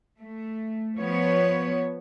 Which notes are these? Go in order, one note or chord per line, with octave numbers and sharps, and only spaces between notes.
A3
F3 B3 C#5